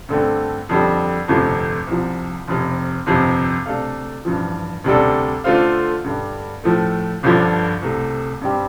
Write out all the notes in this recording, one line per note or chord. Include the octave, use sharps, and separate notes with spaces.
G2 D3 A3 C4
F2 D3 G3
G1 F2 C3 F3 A3
C2 C3 F3
F1 F2 C3
G1 F2 C3
C3 A3 D4 A4 F5
A1 G2 F3
D2 C3 G3 D4 A4
D3 A3 F4 C5 F5
G2 D3 G3
A2 F3 A3
G1 G2 D3 F3
C2 C3 A3
G2 G3 C4 G4